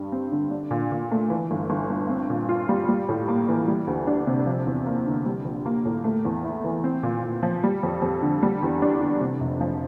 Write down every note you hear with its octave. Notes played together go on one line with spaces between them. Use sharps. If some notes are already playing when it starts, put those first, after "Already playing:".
Already playing: G2 G3
C4
D3
D4
A#2
A#2
A3
E3
G1
G1
G2
C4
A#2
F4
G3
G3
A2
A#3
E3
G3
D2
D4
C3
F3
E2
A#3
D3
G3
A#1
A#3
A2
A3
E2
E4
E3
C4
A#2
A#2
F3
G3
F2
F2
D3
G3
E2
D4
D3
C3
F1
F3